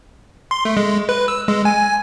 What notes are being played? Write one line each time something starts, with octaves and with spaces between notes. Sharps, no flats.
C6
A3
G#3
B4
E6
G#3
G#5